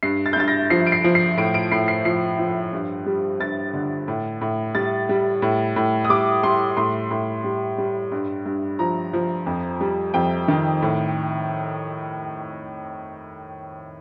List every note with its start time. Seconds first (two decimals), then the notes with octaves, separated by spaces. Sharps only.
0.03 G2 C7
0.26 A6
0.33 G6
0.36 G2 A6
0.48 A#6
0.70 F3 C7
0.87 D7
0.92 C7
1.04 F3
1.15 C7
1.37 A2 D7
1.54 D7
1.72 A2 C7
1.88 C7
2.05 F3 C7
2.39 F3
2.73 G2
3.06 G3
3.40 G2 A6
3.74 D3
4.08 A2
4.41 A2
4.75 G3 A6
5.09 G3
5.42 A2
5.76 A2
6.05 D#6
6.10 G3 D6
6.43 G3 C6
6.77 A2 C6
7.11 A2
7.44 G3
7.78 G3
8.12 G2
8.46 G2
8.79 F3 A#5
9.13 F3
9.46 F2
9.81 G3
10.14 F2 G5
10.48 D#3
10.82 A2